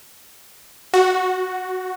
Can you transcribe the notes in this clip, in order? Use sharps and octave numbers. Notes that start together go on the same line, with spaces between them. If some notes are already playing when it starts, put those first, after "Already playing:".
F#4